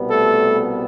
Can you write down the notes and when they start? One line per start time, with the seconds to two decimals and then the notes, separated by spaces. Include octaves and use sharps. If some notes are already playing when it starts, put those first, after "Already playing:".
Already playing: C2 B2 G3 B3
0.08 A3 A4